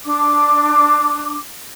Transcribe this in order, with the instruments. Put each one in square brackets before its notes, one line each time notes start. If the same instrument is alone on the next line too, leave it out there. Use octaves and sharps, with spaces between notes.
[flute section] D4 D6